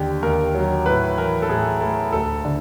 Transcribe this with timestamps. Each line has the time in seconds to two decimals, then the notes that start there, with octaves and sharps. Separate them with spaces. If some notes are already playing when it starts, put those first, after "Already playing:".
Already playing: D#2 D3 G4
0.22 D#2 A#4
0.55 F#3
0.86 A2 B4
1.18 E3 A#4
1.42 A4
1.49 A2 G#4
1.81 A3 A4
2.12 D2 A4
2.45 D3